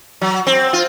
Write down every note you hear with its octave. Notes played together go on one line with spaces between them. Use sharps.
F#3
C4
F4